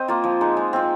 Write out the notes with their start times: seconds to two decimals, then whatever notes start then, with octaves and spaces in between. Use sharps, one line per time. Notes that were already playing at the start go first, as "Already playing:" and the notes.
Already playing: C4 C5 D#5
0.08 A#3 F4
0.24 F3
0.41 G#3 D#4
0.57 G#3
0.73 C4 F4